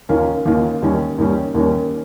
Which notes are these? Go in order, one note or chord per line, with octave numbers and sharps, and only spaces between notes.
D#2 D#3 A#3 C#4 F4
D#2 D#3 A#3 C#4 F4
D#2 D#3 G3 C#4
D#2 D#3 G3 C#4
D#2 D#3 G3 C#4